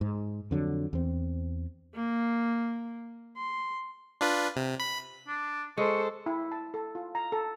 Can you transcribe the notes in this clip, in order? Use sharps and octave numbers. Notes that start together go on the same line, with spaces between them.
G#2
F2 D3 F#3
E2 C4
A#3
C6
D4 F4 B4
C3
B5
D4
G#3 A4 C5 C#6
E4
A5
A4
F4
A#5
A4